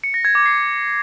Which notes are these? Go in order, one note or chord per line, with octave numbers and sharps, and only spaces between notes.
C#7
A#6
G#6
D6
C7